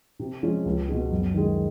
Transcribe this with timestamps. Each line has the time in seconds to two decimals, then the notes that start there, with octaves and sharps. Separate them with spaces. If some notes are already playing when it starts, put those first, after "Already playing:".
0.19 C3
0.43 F3 G#3 C#4
0.65 C#2
0.89 B2 G#3
1.11 F#2
1.34 D#3 G#3